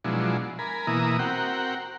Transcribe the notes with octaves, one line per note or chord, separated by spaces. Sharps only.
B2 F3 F#3 G#3 D4 E4
A#4 G#5 B5
B2 E3 A#3 E4 A#5 D#6
C4 F#4 A#4 F#5 G5